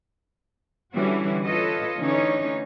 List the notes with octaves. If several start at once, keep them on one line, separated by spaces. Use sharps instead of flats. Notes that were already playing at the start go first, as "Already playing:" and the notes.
D3 E3 G3 C#4 F#4
F4 A4 B4 C#5 D#5
D3 E3 A3 C#4 D#4 C#5